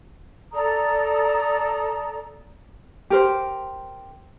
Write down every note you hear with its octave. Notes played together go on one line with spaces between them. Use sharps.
A4 D5 A#5 D#6
G4 A#4 C5